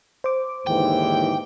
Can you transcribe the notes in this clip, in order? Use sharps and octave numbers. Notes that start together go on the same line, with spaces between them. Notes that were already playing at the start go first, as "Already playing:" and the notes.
C5 D6
D#2 G#2 D3 E3 G5